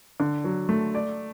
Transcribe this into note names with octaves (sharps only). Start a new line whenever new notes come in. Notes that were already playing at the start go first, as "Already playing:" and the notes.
D3
F#3
A3
D5